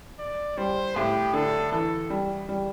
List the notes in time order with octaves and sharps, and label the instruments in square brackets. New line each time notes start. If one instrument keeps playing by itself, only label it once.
[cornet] D5
[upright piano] G3 [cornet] C5
[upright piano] A2 [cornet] G4
[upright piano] D3 [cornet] A4
[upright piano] E3 [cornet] A4
[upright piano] G3
G3